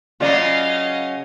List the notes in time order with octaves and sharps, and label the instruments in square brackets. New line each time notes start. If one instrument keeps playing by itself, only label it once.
[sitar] C#3 F#3 [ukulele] F4 D5 [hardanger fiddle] D#5 F5